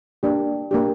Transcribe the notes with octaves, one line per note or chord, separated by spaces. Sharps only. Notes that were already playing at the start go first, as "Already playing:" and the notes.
A#3 D4 G4
A#3 D4 G4